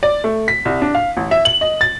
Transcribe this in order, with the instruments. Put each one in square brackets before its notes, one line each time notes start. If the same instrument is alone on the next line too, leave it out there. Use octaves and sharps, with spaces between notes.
[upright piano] D5
A3
B6
C2
D4
F5
A1
E5
F#7
D#5
A6